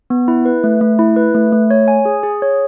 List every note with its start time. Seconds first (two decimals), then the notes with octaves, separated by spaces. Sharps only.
0.10 B3
0.28 E4
0.45 B4
0.64 A3
0.81 A3
0.99 E4
1.16 B4
1.35 A3
1.52 A3
1.71 C#5
1.88 G#5
2.05 G#4
2.23 G#4
2.42 C#5